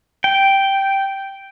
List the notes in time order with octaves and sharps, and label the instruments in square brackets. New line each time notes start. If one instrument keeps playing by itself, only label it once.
[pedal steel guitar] G5